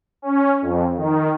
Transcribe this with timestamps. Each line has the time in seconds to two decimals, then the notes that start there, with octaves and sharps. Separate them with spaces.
0.22 C#4
0.62 F2
0.96 D#3